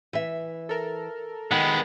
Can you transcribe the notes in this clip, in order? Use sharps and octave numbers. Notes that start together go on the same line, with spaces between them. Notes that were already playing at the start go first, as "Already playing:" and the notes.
E3 E5
A4 A#4
D#3 G#3 B3 F#5 B5